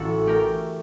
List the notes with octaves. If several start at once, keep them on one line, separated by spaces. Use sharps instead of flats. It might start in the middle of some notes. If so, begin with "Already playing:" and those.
Already playing: A1 F#4 A4
A3 G4 A#4